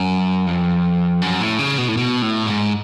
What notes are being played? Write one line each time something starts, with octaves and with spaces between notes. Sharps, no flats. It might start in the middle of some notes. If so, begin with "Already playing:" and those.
Already playing: F#2
F2
F#2
A2
C#3
B2
A2
B2
A2
G#2